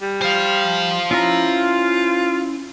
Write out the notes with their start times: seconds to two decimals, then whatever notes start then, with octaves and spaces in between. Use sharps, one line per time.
0.01 G3
0.22 C5 F5
1.11 C#4 E4 F4 A#5